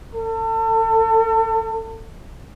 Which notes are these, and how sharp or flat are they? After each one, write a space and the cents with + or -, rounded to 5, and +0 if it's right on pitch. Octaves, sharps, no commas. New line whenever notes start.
A4 +35